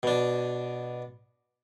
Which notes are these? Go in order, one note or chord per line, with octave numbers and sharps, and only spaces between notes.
B2 D4